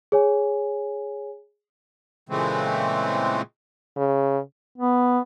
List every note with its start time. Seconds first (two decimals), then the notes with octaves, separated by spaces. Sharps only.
0.12 G#4 C#5 G#5
2.29 A#2 C#3 E3 G#3 A3 C4
3.96 C#3
4.78 B3